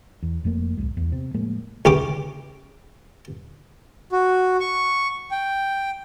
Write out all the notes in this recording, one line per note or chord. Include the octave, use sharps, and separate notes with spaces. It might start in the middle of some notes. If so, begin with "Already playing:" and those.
E2
F1 F2 A3 A#3
D1 G1 C2 G#3
E2
C3
A2 F3 G#3 A#3
C#2 C#4 G4 D6
F#4
C#6
G5